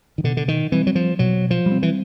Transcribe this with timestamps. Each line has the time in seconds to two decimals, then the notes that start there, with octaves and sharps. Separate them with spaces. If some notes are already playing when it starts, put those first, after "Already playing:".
0.18 D#3
0.24 B2 D3
0.37 D3
0.48 D#3
0.72 E3 G3 C4
0.87 F#3
0.95 F3
1.19 B2 F#3
1.51 F3
1.66 G3
1.71 C4
1.83 E3